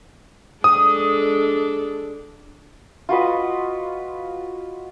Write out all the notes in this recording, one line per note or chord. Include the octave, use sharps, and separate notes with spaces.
G#3 D4 A4 D#6
F4 F#4 B4 D#5